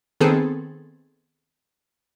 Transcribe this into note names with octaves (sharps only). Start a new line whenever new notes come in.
D#3 B3 C4 G#4 A4